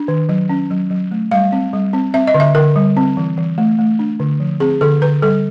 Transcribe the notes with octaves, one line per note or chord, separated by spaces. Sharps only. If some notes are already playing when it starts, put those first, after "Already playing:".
Already playing: D4
D#3
F#3
C#4
F#3
F#3
A3
G3 F5
C4
G3
C4
C4 E5
D#5
D3
E5
D3 A#4
G3
C4
E3
E3
A3
A3
D4
D3
F3
C4 G#4
D3 A4
D3 B4
G3 A4